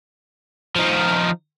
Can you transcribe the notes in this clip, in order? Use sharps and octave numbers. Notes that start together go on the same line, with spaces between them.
F3 D#4